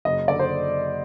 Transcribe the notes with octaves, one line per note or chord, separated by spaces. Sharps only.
F#1 D#5
D3 D5
C5